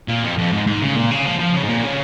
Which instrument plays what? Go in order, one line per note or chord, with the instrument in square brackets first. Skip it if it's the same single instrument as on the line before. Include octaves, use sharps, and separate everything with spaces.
[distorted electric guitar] A#2
F2
F2
G#2
G#2
C#3
A#2
C#3
F3
F3
C#3
G#2
A#2
C#3